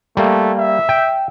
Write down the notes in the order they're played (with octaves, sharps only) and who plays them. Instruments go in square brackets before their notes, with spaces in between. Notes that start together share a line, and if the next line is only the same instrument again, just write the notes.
[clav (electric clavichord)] G3 A#3 [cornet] A3
[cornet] E5
[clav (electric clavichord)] G5